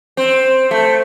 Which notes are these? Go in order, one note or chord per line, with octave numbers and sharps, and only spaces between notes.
C4
A3